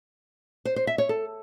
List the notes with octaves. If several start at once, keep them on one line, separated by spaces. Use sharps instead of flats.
C5
C5
E5
C#5
A4